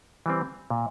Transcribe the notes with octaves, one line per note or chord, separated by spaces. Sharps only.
E3 G3 C4
A#2